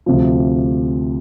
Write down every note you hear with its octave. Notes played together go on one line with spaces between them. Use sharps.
D2 C3 F3